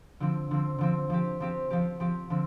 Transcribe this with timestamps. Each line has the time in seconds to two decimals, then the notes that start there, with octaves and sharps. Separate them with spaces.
0.20 D3 F3 C4
0.51 D3 F3 C4
0.78 D3 F3 C4
1.10 F3 C4 G4
1.40 F3 C4 G4
1.70 F3 C4 G4
2.00 F3 C4 G4
2.30 D3 F3 C4